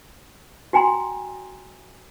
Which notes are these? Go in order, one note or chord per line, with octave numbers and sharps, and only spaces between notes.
F#4 G5 G#5 A#5 C6